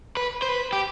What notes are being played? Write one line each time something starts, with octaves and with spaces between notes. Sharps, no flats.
B4
C5
B4
G4